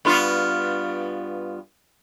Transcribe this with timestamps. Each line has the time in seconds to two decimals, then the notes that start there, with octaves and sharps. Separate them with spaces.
0.05 G2 B3 F4